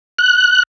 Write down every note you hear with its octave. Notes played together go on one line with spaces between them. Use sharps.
F#6